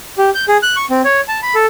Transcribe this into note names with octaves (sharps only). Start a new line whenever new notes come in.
G4
G6
G#4
F#6
C#6
C4
C#5
A5
B5
A4